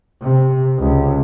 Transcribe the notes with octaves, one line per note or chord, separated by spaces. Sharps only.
C3
C#2